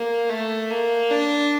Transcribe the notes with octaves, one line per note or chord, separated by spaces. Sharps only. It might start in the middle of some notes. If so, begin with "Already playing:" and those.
Already playing: A#3
A3
A#3
D4